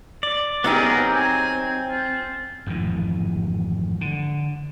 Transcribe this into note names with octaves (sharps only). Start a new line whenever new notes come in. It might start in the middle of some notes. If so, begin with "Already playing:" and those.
D5
F#3 B3 D#4 G4 G#4 A#4
C4
G#5
F4
G#1 F2 A2 E3
D3